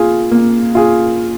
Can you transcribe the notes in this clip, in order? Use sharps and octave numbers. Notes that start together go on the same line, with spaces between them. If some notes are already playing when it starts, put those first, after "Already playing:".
Already playing: A#3 F4 G#4
A#3
F4 G#4